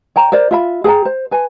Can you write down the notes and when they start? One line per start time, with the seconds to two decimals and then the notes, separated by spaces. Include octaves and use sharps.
0.16 C#5 G5 A#5
0.32 A#4 C5 D5
0.51 F4 E5 B5
0.84 G#4 A4 G5 A#5
1.05 C5
1.31 B4 G#5